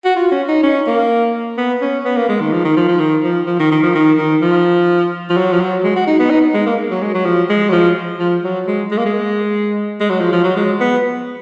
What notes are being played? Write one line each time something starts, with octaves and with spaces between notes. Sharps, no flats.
F#4
F4
C#4
D#4
C#4
A#3
B3
C#4
B3
A#3
G#3
D#3
F3
D#3
F3
F3
D#3
F3
F3
D#3
D#3
F3
D#3
D#3
F3
F3
F#3
F3
F#3
G#3
F#4
D#4
B3
D#4
G#3
A#3
F#3
G#3
F#3
F3
G#3
F#3
F3
F3
F#3
G#3
G#3
A#3
G#3
G#3
F#3
F3
F3
F#3
G#3
B3